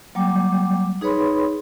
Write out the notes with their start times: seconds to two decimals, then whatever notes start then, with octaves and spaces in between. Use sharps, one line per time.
0.15 F#3 G3 A#3 G5 D6
1.01 D#4 G#4 B4 C#5 B5 C6